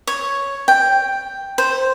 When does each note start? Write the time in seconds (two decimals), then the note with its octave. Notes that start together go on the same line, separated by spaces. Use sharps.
0.07 C#5
0.68 G5
1.58 C5